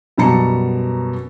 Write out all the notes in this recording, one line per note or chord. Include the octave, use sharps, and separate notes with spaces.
F#2 B2 G3 A5 A#5 C#7